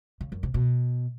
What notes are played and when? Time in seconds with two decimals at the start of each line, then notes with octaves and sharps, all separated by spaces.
0.21 C#3
0.32 F#2
0.43 C3
0.54 B2